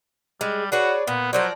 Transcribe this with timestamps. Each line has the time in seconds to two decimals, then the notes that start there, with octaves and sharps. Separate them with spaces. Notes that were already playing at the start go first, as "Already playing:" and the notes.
0.41 G3 G#3
0.72 F#4 G#4 B4 C#5 D5
1.07 A#2 B3
1.33 F3 F#3 A#4 C5 D5